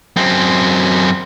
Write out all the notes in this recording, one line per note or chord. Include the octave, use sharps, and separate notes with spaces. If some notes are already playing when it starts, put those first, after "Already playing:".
F#2 C4